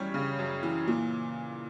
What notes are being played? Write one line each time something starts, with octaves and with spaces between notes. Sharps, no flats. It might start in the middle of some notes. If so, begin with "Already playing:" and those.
Already playing: F#2 E3 G3 C#4 G4 C#5 G5
C#3
F#2
E3
A#2